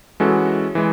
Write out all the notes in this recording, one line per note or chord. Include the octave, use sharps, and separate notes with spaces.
E3 G#3 C#4 F#4 A4
E3 G#3